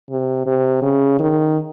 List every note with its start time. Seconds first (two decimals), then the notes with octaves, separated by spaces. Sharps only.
0.10 C3
0.46 C3
0.82 C#3
1.19 D#3